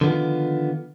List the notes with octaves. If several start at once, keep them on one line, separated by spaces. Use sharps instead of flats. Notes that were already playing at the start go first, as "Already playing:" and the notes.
D3 D#3 F3 B3 F4